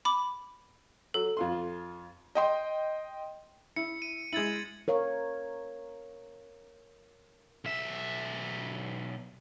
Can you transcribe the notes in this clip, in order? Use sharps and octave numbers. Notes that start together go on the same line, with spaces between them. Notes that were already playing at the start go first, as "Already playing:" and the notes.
B5 D6
F#3 A4
F2 F4 C6
D#5 G5 C6
E4 C#7
D#7
G#3 E4 G#6 A6 F#7
A#4 C#5 F5
B1 E5